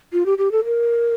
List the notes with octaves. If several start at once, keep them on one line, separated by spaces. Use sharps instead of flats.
F4
G4
G4
A4
A#4